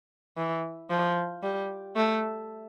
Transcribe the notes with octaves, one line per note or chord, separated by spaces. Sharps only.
E3
F3
G3
A3